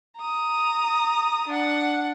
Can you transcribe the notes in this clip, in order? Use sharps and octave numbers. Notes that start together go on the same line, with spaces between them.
A#5 D#6
D4 F#5